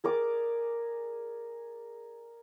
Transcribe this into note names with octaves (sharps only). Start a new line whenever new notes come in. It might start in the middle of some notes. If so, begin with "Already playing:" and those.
G#4 A#4 D5 D6